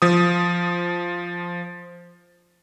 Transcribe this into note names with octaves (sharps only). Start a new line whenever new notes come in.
F3 D#6